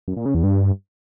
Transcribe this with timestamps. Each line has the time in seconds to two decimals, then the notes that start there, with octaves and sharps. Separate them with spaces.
0.08 F#2
0.17 A#2
0.26 C#3
0.34 E2
0.43 G2